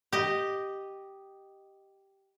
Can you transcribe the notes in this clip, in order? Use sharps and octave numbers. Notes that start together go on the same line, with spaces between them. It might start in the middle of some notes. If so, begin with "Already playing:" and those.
G4 D#5